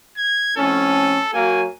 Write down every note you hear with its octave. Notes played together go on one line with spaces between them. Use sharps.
G#6
F2 A2 C#4 A4
F#3 A#3 G#5